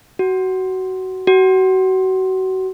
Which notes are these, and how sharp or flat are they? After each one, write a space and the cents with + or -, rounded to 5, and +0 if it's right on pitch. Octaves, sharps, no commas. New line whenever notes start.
F#4 +20
F#4 +30